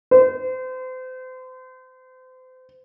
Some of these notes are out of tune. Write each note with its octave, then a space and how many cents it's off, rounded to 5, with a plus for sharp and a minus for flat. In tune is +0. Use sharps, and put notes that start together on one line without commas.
C5 -35